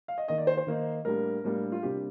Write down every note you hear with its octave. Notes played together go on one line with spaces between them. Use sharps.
F5
D#5
D#3 A#3 D#4 D#5
D5
C5
C5
D#3 A#3 D#4
A2 G3 A#3 D4 A#4
A2 G3 A#3 D4
F4
C3 G3 A#3 D4 G4